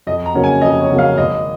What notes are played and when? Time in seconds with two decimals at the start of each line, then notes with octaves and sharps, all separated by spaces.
0.07 F2 D#5
0.26 A#5
0.34 C#3 F#3 A#3 C#4
0.44 G#5
0.61 F2 D#5
0.81 C#5
0.90 C#3 F#3 A#3 C#4
0.98 F5
1.18 G#1 D#5